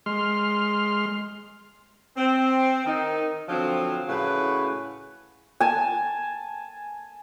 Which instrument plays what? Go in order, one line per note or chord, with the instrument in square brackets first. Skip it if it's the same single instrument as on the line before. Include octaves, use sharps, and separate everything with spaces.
[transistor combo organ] G#3 C6 F6
[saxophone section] C4
D#3 D#4
D3 F3 F#3 C4
A2 C#3 F#4 B4
[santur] G#5 A5